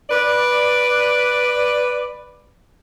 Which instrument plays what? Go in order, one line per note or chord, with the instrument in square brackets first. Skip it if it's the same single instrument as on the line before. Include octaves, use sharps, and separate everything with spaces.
[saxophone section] B4 D5